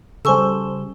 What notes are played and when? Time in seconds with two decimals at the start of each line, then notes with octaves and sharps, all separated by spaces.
0.25 C#3 G3 A4 C5 G#5 C#6 E6